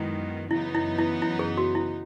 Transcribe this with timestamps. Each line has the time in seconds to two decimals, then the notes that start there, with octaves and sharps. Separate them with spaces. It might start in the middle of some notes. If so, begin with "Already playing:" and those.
Already playing: F#2 D#3 G#3 B3 E4
0.51 F#2 C#3 E3 B3 D#4 E4
0.75 E4
0.98 E4
1.22 E4
1.39 G#4
1.57 F#4
1.75 E4